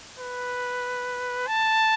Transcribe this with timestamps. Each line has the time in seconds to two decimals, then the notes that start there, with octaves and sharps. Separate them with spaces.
0.20 B4
1.48 A5